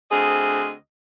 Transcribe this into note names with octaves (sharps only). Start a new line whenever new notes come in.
D2 C4 G#4 D#5